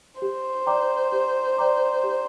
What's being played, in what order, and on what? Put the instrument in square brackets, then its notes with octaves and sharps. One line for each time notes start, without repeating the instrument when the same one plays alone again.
[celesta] G4 [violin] C5
[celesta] D5 G5 A#5 D6
G4
D5 G5 A#5 D6
G4